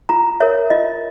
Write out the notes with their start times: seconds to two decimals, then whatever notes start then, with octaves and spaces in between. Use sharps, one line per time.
0.09 F4 A#5
0.40 A#4 C#5 E5
0.70 F4 D#5